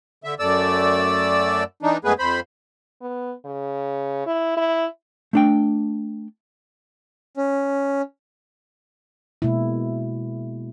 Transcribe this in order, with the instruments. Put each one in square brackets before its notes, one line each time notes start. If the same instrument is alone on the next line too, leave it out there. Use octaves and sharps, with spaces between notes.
[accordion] D3 E5
F#2 A3 D5 E6
E3 D4 D#4
F#2 G#3 A3 B3 G#4 B4
F2 C5 B5
[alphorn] B3
C#3
E4
E4
[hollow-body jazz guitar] A3 D4 G5
[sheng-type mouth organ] C#4
[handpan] B2 G#3 A#3 E4